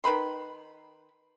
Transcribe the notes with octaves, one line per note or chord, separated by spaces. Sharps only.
D#3 B4 B5 C6